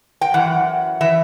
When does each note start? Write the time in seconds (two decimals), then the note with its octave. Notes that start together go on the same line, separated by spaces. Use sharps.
0.21 G5
0.34 F#2 E3 F#5
1.01 E3 E5